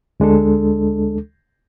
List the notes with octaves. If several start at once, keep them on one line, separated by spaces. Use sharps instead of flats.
D2 G#3 D4 A4